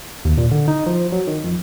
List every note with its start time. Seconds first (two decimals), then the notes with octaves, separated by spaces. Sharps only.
0.25 D#2
0.38 A#2
0.51 D3
0.68 D#4
0.86 F3
1.12 F#3
1.27 D#3
1.44 F2